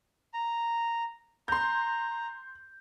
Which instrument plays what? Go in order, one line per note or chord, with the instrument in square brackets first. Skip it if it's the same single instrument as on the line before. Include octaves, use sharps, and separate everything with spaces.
[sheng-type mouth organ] A#5
[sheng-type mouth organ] A#5 [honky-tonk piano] C6 G6